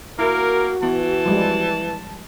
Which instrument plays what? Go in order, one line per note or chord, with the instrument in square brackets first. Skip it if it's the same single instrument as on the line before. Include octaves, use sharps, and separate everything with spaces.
[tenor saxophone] A#3 [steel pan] E4 [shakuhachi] F#4 [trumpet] A#4
[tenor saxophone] E3 [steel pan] B3 [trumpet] A5
[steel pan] F3 G3 G#3